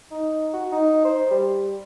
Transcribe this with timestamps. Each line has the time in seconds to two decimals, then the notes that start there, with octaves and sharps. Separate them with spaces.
0.11 D#4
0.54 F#4
0.72 D#4
1.05 C5
1.31 G3